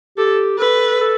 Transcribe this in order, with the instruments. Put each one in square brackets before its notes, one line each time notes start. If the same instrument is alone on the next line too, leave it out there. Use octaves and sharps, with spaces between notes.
[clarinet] G4 [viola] A4
[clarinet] A4 [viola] B4
[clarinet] A4